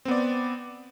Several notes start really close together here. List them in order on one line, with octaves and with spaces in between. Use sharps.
C4 B3 D5